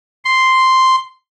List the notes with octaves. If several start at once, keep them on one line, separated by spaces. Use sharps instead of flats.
C6